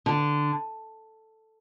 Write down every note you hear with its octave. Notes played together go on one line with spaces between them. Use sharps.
D3